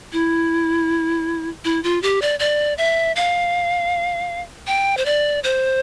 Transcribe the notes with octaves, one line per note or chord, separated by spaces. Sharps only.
E4
E4
F4
G4
D5
D5
E5
F5
G5
C5
D5
C5